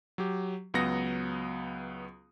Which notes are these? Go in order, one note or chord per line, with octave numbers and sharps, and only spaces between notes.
F#3 G4
C#2 F#3 B3 D#6 A#6 C#7